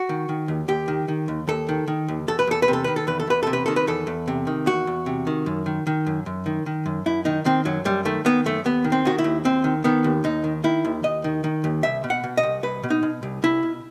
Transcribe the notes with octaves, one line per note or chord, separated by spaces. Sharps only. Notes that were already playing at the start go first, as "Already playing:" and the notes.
Already playing: F#4
D#3
D#3
D#2
D#2 G4
D#3
D#3
D#2
D#2 A4
D#3
D#3
D#2
E2 A4
B4
E2 A4
B4
C3
A4
D#3 B4
A4
E2 B4
A4
E2 B4
C3 A4
B4
D#3 A4
B4
E2 A4
E2
C3
D#3
E2 F#4
E2
C3
D#3
F#2
D#3
D#3
F#2
F#2
D#3
D#3
F#2
F#2 E4
D#3 D#4
D#3 C4
F#2 F#3
F#2 G3
D#3 A3
D#3 B3
F#2 A3
D#2 B3
D#3
C4
D#3 F#4
E4
D#2
D#2 C4
D#3
D#3 B3
D#2
D#2 D#4
D#3
D#3 E4
D#2
D#2 D#5
D#3
D#3
D#2
C2 E5
B2
F#5
B2
D#5
C2
C2 B4
B2
D#4
B2
C2
C2 E4
B2